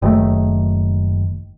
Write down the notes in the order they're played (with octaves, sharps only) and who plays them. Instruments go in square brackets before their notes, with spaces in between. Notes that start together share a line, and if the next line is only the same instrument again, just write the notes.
[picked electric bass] F#1 D#3 A3